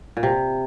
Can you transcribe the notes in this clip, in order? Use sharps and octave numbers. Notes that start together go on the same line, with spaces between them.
A#2
C3